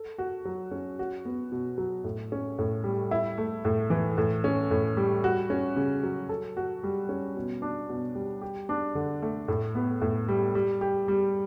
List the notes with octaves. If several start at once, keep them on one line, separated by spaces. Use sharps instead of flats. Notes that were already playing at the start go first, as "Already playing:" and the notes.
Already playing: A4
F#4
F#3
C#4
F#4
B3
B2
F#3
A2
C#4
A2
G3
E4
A3
A2
E3
A2
C#4
A2
G3
F#4
C#4
C#3
F#3
A4
F#4
G3
C#4
B2
D4
B2
G3
G4
D4
D3
A3
A2
B3
A2
G3
G3
G4
G3